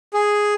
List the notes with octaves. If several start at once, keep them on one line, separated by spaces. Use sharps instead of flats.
G#4